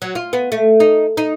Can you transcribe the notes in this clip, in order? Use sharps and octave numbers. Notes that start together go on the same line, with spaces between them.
F#3
F4
B3
A3
D#4
D#4